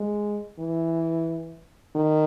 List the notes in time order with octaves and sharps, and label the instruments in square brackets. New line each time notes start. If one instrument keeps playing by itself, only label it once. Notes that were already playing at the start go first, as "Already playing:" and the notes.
Already playing: [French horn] G#3
E3
D#3